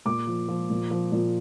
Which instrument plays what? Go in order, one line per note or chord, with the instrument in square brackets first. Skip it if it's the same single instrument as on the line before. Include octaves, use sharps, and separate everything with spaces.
[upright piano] A#2 D6
F3
F3
A#2
F3
A#2